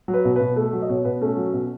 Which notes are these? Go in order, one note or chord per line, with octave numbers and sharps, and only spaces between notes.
F#3
B4
B2
B2 B4
A3
F#3
D#5
B2 C#5
B2 B4
A3 C#4
F#3
B2